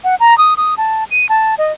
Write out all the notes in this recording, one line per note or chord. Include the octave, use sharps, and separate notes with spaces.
F#5
A#5
D#6
D#6
A5
D#7
A5
D#5